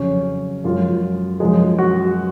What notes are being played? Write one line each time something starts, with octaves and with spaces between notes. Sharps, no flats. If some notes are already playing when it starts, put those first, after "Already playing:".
Already playing: F2 C#3 F#3 C#4
F#2 F3 G#3 F4
F#2 F3 G#3
F#4